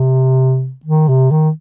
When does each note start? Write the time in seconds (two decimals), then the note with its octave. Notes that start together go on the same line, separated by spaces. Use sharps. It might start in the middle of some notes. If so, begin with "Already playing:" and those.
Already playing: C3
0.85 D#3
1.09 C3
1.31 D#3